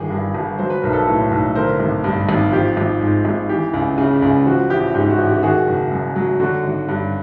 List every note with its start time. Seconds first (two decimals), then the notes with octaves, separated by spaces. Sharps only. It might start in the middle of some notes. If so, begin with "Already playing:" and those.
Already playing: G1 D#3 G#4
0.10 G2
0.34 G1
0.59 F#3 C5
0.70 B4
0.82 B1 A#4
0.93 A4 B4
1.07 A2
1.31 B1
1.55 D3 A#4 C5
1.80 G#1
2.04 G2
2.29 G#1
2.52 F3 G4
2.77 G#1
3.01 G#2
3.25 G#1
3.49 E3 G4
3.74 C#2
3.98 C#3
4.22 C#2
4.46 F3 F#4
4.70 A1 G4
4.94 G#2 G4
5.10 F#4
5.18 A1
5.27 G4
5.43 D#3 F#4 G#4
5.67 F#1
5.91 F#2
6.16 F#3
6.40 D3 F#4
6.64 G#1
6.88 G2